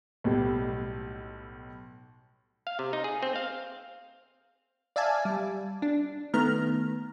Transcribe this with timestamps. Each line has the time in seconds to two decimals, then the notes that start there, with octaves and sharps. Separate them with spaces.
0.24 B1 A2 G3
2.67 F5
2.79 C3
2.93 D#4
3.04 G#4
3.23 C4
3.36 F5
4.96 D5 E5 F5 G#5 A5
5.25 G3
5.82 D4
6.34 D#3 A3 B3 A#5 F6